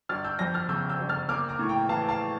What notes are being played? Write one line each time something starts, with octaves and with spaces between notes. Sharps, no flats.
G1 F6 A6
E6 G6
F2 G6 A#6
F6 A6
C#3 E6 G6
E6 G6
G1
F6 A6
A#3 D6 F6
A#5 D6
A2 C#6
G5 A#5
E3 F5 A5
F5 A5